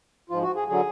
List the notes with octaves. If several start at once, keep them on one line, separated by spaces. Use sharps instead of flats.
G#2 F3 F4
F#4
G#4
D3 F#3 G#4